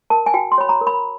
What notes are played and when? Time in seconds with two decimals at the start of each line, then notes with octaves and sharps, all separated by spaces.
0.10 A#4 A5
0.26 G#5
0.34 F#4 G5
0.52 C6
0.58 C#5 B5
0.69 A#5
0.81 A#4
0.87 B5